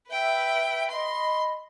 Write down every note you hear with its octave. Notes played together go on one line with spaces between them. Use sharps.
B4 E5 G5
D#5 B5 C6